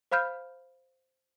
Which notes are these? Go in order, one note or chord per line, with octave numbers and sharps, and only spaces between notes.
C5 F5 B5 F6 G6